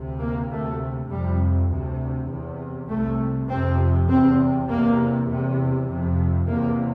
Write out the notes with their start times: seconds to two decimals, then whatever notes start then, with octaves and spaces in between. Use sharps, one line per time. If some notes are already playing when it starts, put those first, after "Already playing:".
Already playing: D2 C3
0.20 A#3
0.51 D2 C3 A3
1.10 F2 C3 G3
1.69 D2 C3
2.29 E2 C3
2.88 C2 C3 A3
3.48 F2 C3 C4
4.08 E2 C3 C4
4.69 E2 C3 A#3
5.28 E2 C3
5.88 F2 C3
6.47 E2 C3 A#3